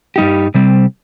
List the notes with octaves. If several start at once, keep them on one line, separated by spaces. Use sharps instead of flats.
G2 G3 D#4 G4
C3 G3 C4